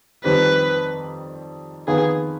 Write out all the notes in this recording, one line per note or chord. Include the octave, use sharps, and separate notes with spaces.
F2 D#3 G3 C4 G4 B4
F2 D#3 B3 F4 G#4 B4